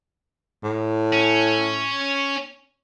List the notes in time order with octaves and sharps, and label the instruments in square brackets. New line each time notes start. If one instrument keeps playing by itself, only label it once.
[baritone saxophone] A2
[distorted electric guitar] C#4